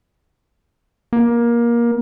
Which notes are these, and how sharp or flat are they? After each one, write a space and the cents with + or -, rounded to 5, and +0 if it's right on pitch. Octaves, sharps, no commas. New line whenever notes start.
A#3 +20